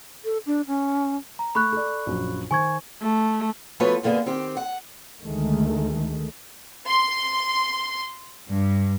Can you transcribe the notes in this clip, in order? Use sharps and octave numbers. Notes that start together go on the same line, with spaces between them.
A4
D4
C#4
A#5
A3 B5 C#6 F#6
A4 D5
A#1 F#2
D#3 C5 G#5 C#6 G#6
A3
F3 A3 B3 F#4 B4 C#5
F#2 D3 A#3 B3 G#4
D#3 C4 G4
F#5
D2 D#3 G#3 A3
C6
G2